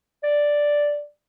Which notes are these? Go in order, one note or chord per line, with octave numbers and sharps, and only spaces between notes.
D5